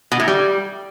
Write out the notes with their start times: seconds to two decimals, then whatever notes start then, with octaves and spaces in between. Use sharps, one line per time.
0.12 B2
0.20 A2
0.28 G3